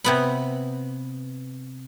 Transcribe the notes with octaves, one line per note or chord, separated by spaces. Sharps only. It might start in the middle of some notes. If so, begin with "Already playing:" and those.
C3 B3 B5